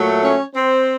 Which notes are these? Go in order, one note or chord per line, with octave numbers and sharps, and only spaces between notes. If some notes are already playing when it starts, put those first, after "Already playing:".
Already playing: A#2 F#3 A3
C#4 C#5
C4 C5